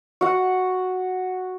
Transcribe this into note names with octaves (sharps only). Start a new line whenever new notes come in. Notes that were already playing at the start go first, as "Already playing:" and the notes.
F#4 F#5